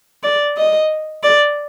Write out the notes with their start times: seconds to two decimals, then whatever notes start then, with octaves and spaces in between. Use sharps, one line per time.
0.23 D5
0.57 D#5
1.23 D5